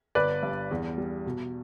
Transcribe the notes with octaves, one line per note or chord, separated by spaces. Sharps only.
G1 B4 D5
G2
E2
G3
B2